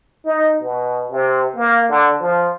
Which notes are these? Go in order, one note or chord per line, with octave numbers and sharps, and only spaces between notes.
D#4
B2
C3
A#3
D3
F3